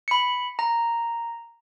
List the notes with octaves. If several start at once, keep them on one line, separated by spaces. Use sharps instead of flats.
B5 C#7
A#5